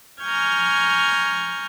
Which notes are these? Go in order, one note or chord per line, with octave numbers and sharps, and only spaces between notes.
G#5 A#5 C#6 F6 G6 G#6